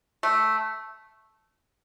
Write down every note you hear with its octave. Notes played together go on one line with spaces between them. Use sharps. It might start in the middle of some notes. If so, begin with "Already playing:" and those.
A3